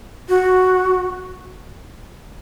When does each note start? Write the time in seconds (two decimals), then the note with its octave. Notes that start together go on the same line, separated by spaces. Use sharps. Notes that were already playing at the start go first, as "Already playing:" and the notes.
0.29 F#4